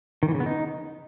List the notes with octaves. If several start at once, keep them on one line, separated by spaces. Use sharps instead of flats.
D#3
E3
C#3
B3
D#4